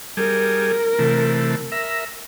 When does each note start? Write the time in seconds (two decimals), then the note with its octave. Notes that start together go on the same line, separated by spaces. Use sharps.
0.17 G3 G#4 A#4
0.99 C3 E3 A3
1.72 A#4 E5